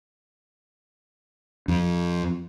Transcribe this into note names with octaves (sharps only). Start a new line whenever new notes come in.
F2